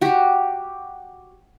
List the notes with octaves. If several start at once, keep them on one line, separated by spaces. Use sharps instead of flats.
F#4 G4